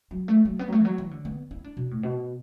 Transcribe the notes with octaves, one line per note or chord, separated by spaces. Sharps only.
F#3
A3
F#3
B3
F#3
A3
E3
F#3
E3
D3
B3
E4
D4
B2
A2
B2